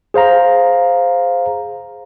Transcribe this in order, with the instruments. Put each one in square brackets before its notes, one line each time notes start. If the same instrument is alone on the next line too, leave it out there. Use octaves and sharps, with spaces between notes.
[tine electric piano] G#4 C5 F5 A#5